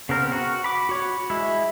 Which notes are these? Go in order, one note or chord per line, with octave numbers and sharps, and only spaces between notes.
C#3 B3 C4 A#4
F#4
B5 D6
F#4 C#5
G#3 E4